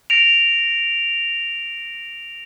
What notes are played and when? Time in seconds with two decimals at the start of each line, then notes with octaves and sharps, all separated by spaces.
0.10 A#6 D7 F7